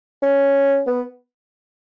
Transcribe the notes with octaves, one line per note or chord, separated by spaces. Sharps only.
C#4
B3